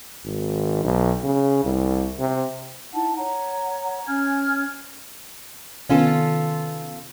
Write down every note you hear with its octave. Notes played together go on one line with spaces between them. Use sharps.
G#1
B1
C#3
C2
C3
D#4 E4 F#5 A5
C#5 F#5 A#5
C#4 G#5 F6 G#6
C3 D#3 B3 C#4 F4 A4